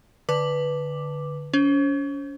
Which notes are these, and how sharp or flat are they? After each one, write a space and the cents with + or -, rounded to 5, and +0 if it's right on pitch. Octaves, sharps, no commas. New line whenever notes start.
D3 +0 B4 +0 D6 +0
C#4 +35 C5 +35